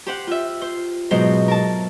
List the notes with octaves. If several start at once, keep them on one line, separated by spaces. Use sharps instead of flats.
G4 C5 F#5
F4 E5
C5
G#2 B2 F#3 C5
A#4 A5